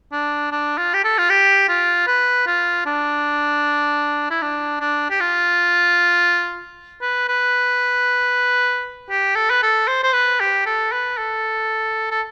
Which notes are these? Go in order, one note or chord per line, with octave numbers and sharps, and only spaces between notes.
D4
D4
F4
G4
A4
F4
G4
F4
B4
F4
D4
E4
D4
D4
G4
F4
B4
B4
G4
A4
B4
A4
C5
C5
B4
G4
A4
B4
A4
A4